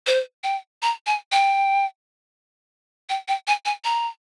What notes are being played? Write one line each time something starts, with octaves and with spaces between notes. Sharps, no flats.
C5
G5
A#5
G#5
G5
G5
G5
G#5
G#5
A#5